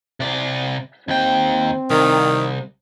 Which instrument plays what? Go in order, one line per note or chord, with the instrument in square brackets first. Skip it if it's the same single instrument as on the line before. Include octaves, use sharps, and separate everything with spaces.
[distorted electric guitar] C3 D5
[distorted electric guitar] D#2 G5 [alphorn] C4
[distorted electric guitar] C2 [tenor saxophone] D#3